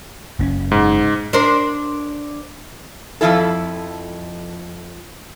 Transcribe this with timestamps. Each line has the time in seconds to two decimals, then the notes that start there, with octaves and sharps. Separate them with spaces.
0.39 F#1 C4 C#4
0.72 G#2
1.33 D4 A#4 C5
3.21 F2 A#2 F3 E4 A4